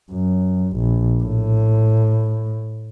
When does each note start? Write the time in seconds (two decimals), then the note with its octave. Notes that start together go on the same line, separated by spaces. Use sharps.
0.12 F#2
0.77 A#1
1.24 A2